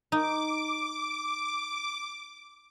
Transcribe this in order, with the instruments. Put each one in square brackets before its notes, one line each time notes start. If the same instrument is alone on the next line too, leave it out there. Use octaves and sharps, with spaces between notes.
[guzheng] D#4 [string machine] D6